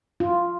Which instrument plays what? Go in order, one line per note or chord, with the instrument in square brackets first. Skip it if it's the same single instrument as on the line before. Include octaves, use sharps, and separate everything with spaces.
[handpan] F4